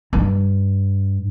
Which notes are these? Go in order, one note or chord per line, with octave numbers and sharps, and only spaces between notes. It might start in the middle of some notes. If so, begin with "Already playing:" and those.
G2